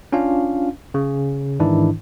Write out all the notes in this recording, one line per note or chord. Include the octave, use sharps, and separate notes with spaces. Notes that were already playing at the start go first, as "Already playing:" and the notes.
C#4 D4 F4 F5
C#3
G#2 D#3 E3 D4 E4